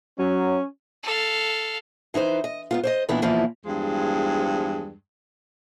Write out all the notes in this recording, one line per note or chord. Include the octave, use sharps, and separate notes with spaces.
F#3 C#4
A4 F5
E3 D#4 B4 C5
D#5
G#2 B3 F4
C5 D5 D#5
A#2 D#3 E3 B3 D4 E4
E2 B2 E3 F3 A#3 E4
E2 G2 F3 G#3